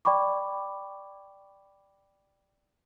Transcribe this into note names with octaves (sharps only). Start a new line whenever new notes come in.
D5 G5 B5 C#6 D6